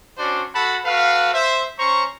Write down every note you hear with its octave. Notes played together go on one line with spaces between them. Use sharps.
C#4 D4 F#4 C5 D5
F#4 A4 F#5 A5 B5
F#4 A4 B4 F5
C5 E5
C#4 C5 A#5 C#6